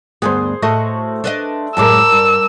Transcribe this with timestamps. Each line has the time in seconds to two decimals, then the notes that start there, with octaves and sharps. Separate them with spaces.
0.22 D2 G2 B3 G#4 C5
0.62 A2 A3 F#4 D#5
1.24 D4 B4 D#5
1.77 F#2 A2 G#3 A#4 D5 A5 E6
2.12 G2